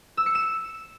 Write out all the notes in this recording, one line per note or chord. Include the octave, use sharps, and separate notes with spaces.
E6
C#7
E7